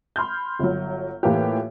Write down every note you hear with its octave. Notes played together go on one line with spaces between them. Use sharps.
B5 C6 F6 G6
G1 F#3
A2 E3 A#3 F4 G4